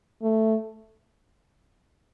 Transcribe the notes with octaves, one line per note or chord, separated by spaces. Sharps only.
A3